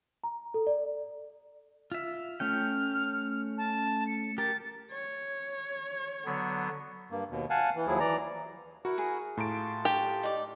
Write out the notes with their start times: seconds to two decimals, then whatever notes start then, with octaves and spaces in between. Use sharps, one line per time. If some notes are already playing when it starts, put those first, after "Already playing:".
0.24 A#5
0.54 A4
0.67 D5
1.92 F4 E5
2.40 A3 C#4 G5 F6
3.58 A5
4.07 C#7
4.38 G4 A#4 A6
4.92 C#5
6.25 D3 F#3 B3
7.11 G2 A#3
7.30 D#2 B2
7.50 F5 F#5 G#5 A5
7.76 E3
7.87 D#2 F3 F#3 E4 G#4
8.00 E3 D5 A#5
8.85 E4 F#4 A#4 F#5
8.98 G#4
9.37 A2 F4 A5 A#5 D7
9.85 G4
10.23 D#4 D5